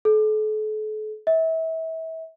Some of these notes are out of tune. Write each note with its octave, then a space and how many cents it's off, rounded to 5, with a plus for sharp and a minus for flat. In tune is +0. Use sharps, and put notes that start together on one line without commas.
A4 -40
E5 -30